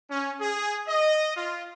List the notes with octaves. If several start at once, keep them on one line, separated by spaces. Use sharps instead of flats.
C#4
G#4
D#5
F4